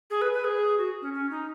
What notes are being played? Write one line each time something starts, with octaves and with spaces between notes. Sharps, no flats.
G#4
B4
B4
G#4
F#4
C#4
C#4
D#4